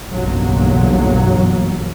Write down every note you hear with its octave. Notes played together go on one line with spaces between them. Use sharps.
F#1 B1 E2 G2 F#3 A#3